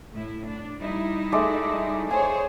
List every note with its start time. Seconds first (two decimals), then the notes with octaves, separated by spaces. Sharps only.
0.13 A2 E4
0.47 D4
0.80 G3 D#4 E4
1.32 G#3 A3 D5
2.11 G#4 C5 C#5 G#5